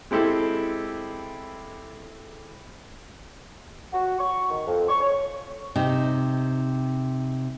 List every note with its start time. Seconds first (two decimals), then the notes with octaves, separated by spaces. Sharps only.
0.11 G#3 C4 E4 G4 A4
3.93 F#4
4.19 C#6
4.50 D#3
4.67 F2
4.89 C#6
5.01 C#5
5.76 C3 D#4